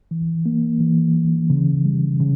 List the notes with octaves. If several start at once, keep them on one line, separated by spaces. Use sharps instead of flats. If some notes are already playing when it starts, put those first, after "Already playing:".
E3
A#3
E3
E3
C#3
G3
C#3